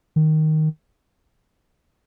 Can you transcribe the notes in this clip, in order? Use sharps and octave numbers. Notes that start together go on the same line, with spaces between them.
D#3